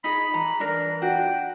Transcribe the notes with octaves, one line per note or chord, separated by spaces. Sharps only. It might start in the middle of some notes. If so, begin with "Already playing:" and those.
D#4 G#4 B5
E3 A#5
D4 A#4
D4 F#4 G5